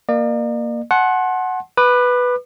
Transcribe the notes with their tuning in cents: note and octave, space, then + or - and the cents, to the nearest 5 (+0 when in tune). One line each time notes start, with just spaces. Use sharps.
A#3 +0 D5 +45
F#5 +0 A5 -40 C6 +25
B4 +0 D6 +40